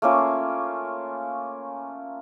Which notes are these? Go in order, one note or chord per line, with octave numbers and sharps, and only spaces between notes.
A3 A#3 C#4 F4